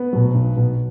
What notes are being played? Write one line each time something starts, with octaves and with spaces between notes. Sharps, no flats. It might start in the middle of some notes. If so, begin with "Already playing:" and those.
Already playing: B3
B2 F#3
B1
B2 F#3